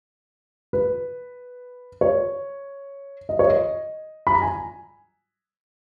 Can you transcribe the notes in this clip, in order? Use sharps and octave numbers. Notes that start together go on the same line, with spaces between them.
B4
C#5
D#5
C#5
D#5
B5
A#5
G#5